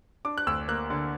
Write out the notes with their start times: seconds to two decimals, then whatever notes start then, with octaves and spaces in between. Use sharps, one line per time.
0.25 D4 D6
0.38 F#6
0.47 D2 E6
0.68 A#3 F#6
0.90 D3